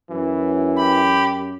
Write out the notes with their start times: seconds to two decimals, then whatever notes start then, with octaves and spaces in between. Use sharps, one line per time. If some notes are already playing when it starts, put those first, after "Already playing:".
0.10 F#2 E3
0.76 G4 B5